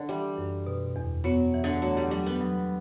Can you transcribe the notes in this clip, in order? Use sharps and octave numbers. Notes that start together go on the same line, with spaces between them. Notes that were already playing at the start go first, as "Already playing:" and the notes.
Already playing: D3
E3 G3
F#2
B2
E2
F#3 B3
E3
D3
F#3 A3
G3
F#3 G3
B3
F#3